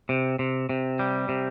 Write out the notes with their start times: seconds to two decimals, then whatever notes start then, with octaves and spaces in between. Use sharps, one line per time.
0.09 C3
0.39 C3
0.69 C3
0.99 G3
1.29 C3